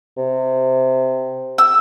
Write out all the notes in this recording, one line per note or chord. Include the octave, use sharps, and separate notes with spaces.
C3
E6